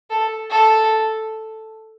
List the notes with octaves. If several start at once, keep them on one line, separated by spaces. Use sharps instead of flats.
A4
A4